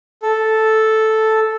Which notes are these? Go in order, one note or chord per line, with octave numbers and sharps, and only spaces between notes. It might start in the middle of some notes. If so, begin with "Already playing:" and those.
A4